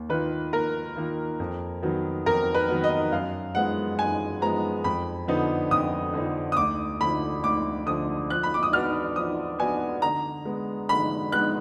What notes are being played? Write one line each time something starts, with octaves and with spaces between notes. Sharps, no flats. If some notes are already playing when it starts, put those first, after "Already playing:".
Already playing: D#2
D#3 A#3 F4 B4
D#2 A#4
D#3 A#3 F4
F2
D#3 F#3 B3
F2 A#4
B4
D#3 F#3 B3
D#5
F#2 F5
F3 G#3 B3 F#5
F#2 G#5
F3 G#3 B3 A#5
F2 B5
D3 F3 B3 D#4
F2 D#6
D3 F3 B3 D#4
D#6
D2 D6
D3 F3 B5
D2 D6
D3 F3 D#6
F3 F#6
B5
D6
D#6
B3 D4 F#4 D5 F6
F3 D#6
B3 D4 F#4 D5 G#5
D3 A#5
G#3 B3
D3 B5
G#3 B3 F#6